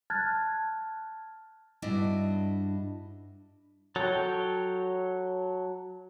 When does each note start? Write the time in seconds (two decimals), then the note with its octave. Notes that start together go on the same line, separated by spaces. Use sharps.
0.10 A5 F6 F#6 G#6 A6
1.82 G2 D4 E4 F#4 D#5
3.96 F#3 A4 C#5 G5